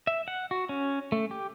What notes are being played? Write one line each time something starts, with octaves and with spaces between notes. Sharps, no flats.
E5
F#5
F#4
C#4
A3
G4